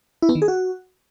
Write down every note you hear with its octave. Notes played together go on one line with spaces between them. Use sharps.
E4
B3
D#3
G#4
F#4